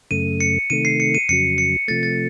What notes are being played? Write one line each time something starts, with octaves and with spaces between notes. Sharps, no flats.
F#2 C#3 A3 D#7
C#7
C3 D#3 A3 D#7
C7
C#7
D#7
F2 C#3 F#3 C#7
C#7
C3 F3 A3 A6
A6